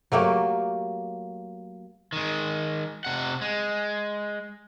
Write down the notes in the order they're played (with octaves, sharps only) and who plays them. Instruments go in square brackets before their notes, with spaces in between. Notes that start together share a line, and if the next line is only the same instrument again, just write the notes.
[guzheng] F#3 A3 A#3 G4
[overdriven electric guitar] D#3 G#3
C3 F#5
G#3